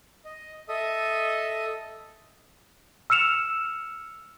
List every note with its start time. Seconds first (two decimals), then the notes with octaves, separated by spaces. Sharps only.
0.25 D#5
0.68 A4 D#5 E5 D#6
3.10 E6 F6 C#7 E7 F7